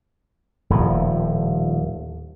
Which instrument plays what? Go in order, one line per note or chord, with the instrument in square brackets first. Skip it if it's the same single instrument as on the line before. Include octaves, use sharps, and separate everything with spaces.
[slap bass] D#1 A2 F3